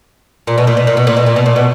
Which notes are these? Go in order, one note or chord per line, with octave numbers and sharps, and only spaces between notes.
A#2
B2
A#2
B2
A#2
B2
A#2
B2
A#2
B2
A#2
B2